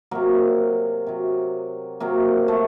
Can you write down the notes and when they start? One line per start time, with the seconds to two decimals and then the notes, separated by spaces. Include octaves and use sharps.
0.11 C3 F#3 A#3
1.07 C3 F#3
2.00 C3 F#3 A#3
2.48 A3